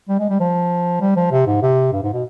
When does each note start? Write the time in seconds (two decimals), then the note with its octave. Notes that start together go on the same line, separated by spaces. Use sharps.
0.09 G3
0.19 G#3
0.30 G3
0.40 F3
1.01 G3
1.16 F3
1.32 C3
1.47 G#2
1.62 C3
1.92 G2
2.02 G#2
2.13 B2